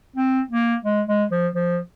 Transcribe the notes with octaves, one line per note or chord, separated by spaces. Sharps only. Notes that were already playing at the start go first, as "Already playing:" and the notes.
C4
A#3
G#3
G#3
F3
F3